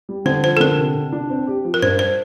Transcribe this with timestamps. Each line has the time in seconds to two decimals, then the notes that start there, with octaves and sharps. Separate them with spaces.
0.09 G3
0.25 D3 C5
0.43 F3 C5
0.57 A4
0.60 D3 A#4
0.78 C3
0.95 C3
1.12 D4
1.30 C4
1.47 G4
1.65 F3
1.74 A#4
1.82 G2 C5
1.99 C5